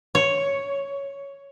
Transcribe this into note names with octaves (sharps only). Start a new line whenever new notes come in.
C#5